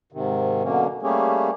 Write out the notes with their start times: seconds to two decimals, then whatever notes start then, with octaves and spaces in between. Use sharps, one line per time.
0.12 G#2 C3 D#3
0.63 B2 D3 F#3 A#3 C#4
1.02 G3 A3 A#3 C#4 G4 G#4